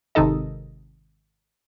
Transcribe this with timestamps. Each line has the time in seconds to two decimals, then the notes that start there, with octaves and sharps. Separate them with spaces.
0.15 G#1 C3 D#3 D#4 A4 D#5